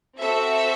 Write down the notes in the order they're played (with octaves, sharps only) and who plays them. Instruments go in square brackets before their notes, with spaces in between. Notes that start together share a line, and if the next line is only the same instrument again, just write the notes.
[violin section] C4 F#4 A4 E5